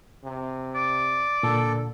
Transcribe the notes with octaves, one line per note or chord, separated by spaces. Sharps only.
C3
D5
A#2 D3 A4